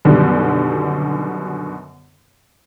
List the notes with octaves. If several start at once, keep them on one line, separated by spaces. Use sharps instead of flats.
F#2 B2 D3 D#3 G3